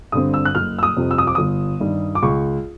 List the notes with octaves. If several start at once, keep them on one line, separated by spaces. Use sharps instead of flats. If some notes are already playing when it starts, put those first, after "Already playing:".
G2 D3 G3 C4 D#6
E6
F#6
F#1 F6
E6
D#6
F2 C3
E6
D#6
D6
G1 D#6
G2 D#3 G3
D6
C#2 C#6